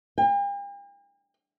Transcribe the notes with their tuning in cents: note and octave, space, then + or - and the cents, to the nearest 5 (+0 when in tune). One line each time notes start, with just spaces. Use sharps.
G5 +45